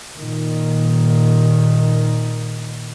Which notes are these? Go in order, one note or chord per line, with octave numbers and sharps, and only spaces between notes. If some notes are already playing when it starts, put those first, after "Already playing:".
A#2 D#3